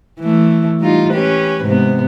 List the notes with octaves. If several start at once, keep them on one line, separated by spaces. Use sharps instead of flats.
E3 A3
G3 D#4 F4
C#4 G4 B4
G#2 C3 B3